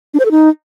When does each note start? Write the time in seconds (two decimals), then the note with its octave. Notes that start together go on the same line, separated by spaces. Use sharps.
0.14 D4
0.19 C5
0.25 A4
0.31 D#4